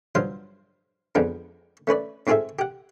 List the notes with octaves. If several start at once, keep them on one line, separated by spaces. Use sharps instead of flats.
G2 F3 F#3 C5 F5
F2 F3 G#3 B3 D4
A3 C#4 B4 D5
G#2 C4 F4 G#4 A4 E5
G4 F#5